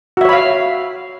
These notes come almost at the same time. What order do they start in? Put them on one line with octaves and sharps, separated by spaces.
F#4 E5 C#5 B5 F5